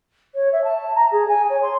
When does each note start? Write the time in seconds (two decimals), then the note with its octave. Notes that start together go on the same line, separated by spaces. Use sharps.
0.34 C#5
0.52 E5
0.64 A5
0.95 A#5
1.11 G#4
1.28 G#5
1.49 C#5
1.62 C6